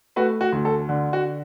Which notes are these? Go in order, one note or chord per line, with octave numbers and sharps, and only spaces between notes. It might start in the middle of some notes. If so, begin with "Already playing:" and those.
A3 F#4 B4
F#4
D2
A4
D3
F#4